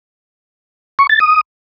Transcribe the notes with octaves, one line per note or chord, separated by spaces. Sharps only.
C#6
A6
D#6